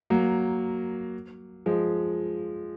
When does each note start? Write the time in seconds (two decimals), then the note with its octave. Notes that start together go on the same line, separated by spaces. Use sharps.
0.10 F#3 A#3
1.66 F3 G#3